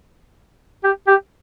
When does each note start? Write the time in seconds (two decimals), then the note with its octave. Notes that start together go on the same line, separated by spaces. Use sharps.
0.84 G4
1.07 G4